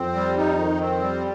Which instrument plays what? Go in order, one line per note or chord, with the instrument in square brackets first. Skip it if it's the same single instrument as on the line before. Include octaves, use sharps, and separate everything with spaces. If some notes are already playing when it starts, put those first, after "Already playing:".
Already playing: [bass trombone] F2 [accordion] C4
[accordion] G3
D#4
D#3
C4
G3